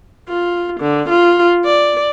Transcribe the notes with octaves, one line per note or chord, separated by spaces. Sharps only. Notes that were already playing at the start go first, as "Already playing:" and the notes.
F4
D3
F4
D5